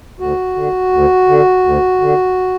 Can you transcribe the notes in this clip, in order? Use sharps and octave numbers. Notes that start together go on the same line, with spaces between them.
D2 F#4
D3
D2
D3
D2
D3